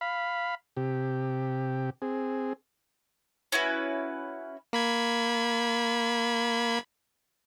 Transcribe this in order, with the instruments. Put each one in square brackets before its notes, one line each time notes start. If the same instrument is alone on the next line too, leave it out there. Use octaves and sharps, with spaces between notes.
[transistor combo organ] F5 B5
C3 G4
C4 G#4
[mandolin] C#4 E4 F#4 B4
[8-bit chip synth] A#3 B5 G#6